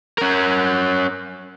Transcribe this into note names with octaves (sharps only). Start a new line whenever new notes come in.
C#4 A#4